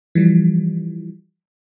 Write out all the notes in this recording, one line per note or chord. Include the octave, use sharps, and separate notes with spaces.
E3 F3 G3